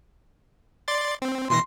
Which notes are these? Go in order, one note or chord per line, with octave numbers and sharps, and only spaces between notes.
D5 C6 A6
C4
B2 E3 C6 A#6